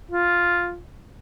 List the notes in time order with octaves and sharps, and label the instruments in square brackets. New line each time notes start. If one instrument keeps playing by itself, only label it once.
[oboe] F4